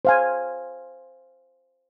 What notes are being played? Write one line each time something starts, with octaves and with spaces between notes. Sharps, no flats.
C5 F5 G#5